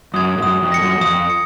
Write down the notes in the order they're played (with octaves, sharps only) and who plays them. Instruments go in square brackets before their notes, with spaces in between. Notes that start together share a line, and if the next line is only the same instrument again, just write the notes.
[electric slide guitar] F#2 [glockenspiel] D#6 G#6
[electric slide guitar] G#2
[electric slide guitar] F#2 [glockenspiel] D#6
[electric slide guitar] F2
[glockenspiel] A#6 C#7
[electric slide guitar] F#2
F#2
[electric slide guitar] F2 [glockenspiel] D#6
[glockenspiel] C#7